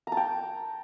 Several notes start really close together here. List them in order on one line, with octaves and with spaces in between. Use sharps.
A#5 A5 G5